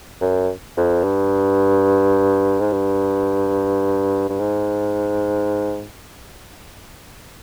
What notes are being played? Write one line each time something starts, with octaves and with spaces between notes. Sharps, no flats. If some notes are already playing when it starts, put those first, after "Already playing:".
F#2
F2
G2
G#2
G2
G2
G#2